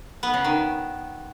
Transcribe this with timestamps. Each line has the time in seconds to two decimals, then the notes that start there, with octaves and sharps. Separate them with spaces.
0.23 B3
0.34 C#3
0.45 D#3